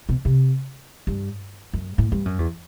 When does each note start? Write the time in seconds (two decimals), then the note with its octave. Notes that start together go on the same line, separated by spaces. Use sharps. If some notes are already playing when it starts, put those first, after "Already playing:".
0.09 B2
0.25 C3
1.07 G2
1.73 F#2
1.98 A2
2.12 G2
2.25 F#2
2.39 E2